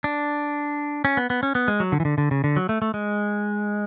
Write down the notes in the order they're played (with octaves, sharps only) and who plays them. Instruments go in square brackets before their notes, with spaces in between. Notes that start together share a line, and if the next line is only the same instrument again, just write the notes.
[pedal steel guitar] D4
C#4
B3
B3
C#4
B3
G#3
F#3
D3
E3
D3
D3
C#3
D3
F#3
A3
A3
G#3